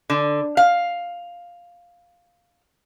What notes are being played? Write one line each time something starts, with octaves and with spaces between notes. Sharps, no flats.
D3
F5